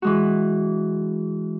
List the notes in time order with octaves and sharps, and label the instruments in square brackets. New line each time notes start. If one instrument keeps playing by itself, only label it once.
[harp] E3 G#3 F#4